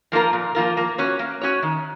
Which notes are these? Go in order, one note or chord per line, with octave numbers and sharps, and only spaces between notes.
F3 A#3 F4 A#4
A#2
F3 A#3 F4 A#4
A#3
C#4 F#4 C#5
A#3
C#4 F#4 C#5
D#3